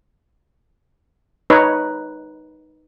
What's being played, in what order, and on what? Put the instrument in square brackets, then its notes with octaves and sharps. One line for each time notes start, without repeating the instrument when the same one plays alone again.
[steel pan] D#4 B4 C#5